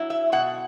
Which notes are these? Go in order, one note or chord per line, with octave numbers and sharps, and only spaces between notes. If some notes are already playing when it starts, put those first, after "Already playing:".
Already playing: F#3 E4
E5
B2 F#5